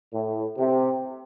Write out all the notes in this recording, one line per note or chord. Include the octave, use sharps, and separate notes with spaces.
A2
C3